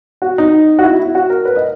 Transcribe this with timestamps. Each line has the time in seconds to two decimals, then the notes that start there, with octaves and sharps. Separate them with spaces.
0.22 F#4
0.38 D#4
0.79 F#4
0.84 E4
1.00 E4
1.15 F#4
1.30 A#4
1.45 B4
1.56 D#5